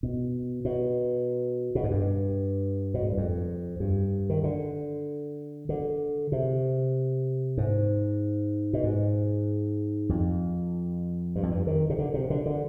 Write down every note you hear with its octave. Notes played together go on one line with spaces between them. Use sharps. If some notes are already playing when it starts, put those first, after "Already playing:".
B2
B2
B2
G#2
G2
B2
G#2
G2
F2
G2
D#3
D3
D3
C3
G#2
B2
G#2
F2
G2
F2
G2
D#3
C3
D3
C3
D3
D3